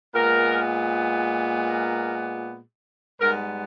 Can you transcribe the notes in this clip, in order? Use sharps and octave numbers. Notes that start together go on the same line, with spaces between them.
A#2 G#3 B3 A#4
A#4
G#2 G3 B3 A#4